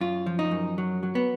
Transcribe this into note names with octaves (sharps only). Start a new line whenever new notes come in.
F#2 F4
F3
D#4
F#2
F#3
F#3
B3